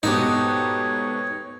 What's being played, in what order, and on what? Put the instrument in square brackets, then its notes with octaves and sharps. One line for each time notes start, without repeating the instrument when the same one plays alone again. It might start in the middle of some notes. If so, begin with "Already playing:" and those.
[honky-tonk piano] G#2 B2 [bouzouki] A3 B3 G4 [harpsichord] D#4 [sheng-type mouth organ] C#5